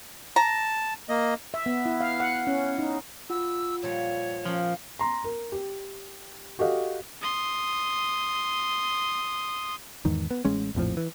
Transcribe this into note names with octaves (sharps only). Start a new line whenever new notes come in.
A5 A#5
A#3 D#5
E5
B3
E4
F5
F#5
C#4
D#4
F4 F#5 E6
A#2 F3 G3 C#5
F3 A#3 C#4 G5
A#5 C6
A#4
G4
F#4 G4 A4 D#5 F5
C6 D#6
E2 G#2 D#3
B3
A1 G#3 C#4
A#1 F2 A2 F3
E3